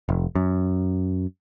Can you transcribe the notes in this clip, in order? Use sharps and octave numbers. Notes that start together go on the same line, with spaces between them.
F1
F#2